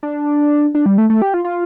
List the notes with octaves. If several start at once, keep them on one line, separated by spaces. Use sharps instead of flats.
D4
D4
G3
A3
A3
G4
F4
F4